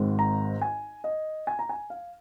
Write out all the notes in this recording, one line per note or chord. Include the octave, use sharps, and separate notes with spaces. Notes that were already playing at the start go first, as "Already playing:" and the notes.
Already playing: G#1 G#2 G#3 C4
A#5
G#5
D#5
G#5
A#5
G#5
F5